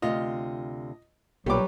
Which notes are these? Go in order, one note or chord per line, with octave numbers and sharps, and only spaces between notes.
D2 C3 F4 D#5
B1 A#2 F#3 G3 G4 B4 D6